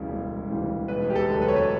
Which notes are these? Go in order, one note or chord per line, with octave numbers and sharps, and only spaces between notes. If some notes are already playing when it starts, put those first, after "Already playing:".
Already playing: E1 D2 C#3 E3 G3
E1
D2 C#3 E3 G3
E1 B4
G4
A4
D2 D3 F#3
B4
C#5
B4